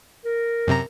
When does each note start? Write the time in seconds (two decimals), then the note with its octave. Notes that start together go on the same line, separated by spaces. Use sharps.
0.25 A#4
0.67 F#2 C3 A#5